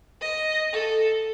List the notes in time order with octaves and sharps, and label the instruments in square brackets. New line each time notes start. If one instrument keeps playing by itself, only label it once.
[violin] D#5
A4